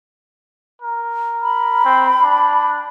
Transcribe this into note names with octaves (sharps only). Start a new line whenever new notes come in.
A#4
B5
C4
D4